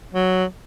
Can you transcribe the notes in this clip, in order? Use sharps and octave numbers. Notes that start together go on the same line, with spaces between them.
F#3